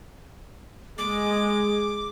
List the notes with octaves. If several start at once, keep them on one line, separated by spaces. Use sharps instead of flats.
G#3 D6